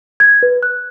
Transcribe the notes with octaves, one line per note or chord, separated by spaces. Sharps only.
G#6
B4
F#6